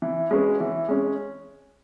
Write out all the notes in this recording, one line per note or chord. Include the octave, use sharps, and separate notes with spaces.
E3
G#3 C#4 F#4 B4
E3
G#3 C#4